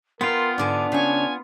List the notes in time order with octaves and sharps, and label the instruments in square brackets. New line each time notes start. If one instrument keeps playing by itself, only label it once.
[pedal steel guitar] B3 F4 [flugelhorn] A#4 [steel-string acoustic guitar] G5 [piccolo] C6
[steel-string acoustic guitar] G#2 D3 G#5 [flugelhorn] D4 [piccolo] D6
[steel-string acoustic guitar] C#3 C#5 [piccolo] G#5